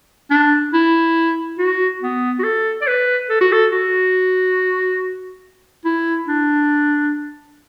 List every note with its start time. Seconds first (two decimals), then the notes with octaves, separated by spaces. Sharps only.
0.30 D4
0.73 E4
1.58 F#4
2.01 B3
2.39 F#4
2.43 A4
2.81 D5
2.87 B4
3.30 A4
3.41 F#4
3.52 A4
3.72 F#4
5.85 E4
6.28 D4